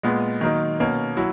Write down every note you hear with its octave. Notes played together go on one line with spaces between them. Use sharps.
A#2 G#3 B3
D#3 F#3 A#3 D#4
B2 A#3 C#4
F#3 E4